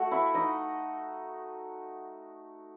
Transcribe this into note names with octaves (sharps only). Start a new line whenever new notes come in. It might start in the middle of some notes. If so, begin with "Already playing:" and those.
Already playing: A3 F#4 F#5
E4 E5
D#4 D#5